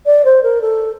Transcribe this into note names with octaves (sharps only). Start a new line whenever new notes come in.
D5
C5
A#4
A4